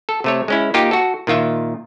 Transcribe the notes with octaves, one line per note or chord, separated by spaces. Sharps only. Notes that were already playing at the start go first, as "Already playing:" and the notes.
A4
C3 A3 C#5
G#3 C#4 E4
A#3 D#4 F4 G4
F#4 A4
A#2 D#3 F4 E5